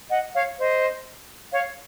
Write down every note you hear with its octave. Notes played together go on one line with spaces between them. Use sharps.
D#5 F#5
C#5 F5
C5 D#5
C#5 F5